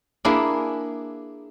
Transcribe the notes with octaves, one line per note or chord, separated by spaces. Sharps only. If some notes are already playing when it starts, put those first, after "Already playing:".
A#3 D4 E4 G#4